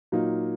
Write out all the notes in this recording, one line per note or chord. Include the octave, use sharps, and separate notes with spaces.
A#2 F#3 A#3 D#4